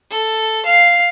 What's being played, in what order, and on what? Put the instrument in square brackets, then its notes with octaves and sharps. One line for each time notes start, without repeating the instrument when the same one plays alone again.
[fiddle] A4
F5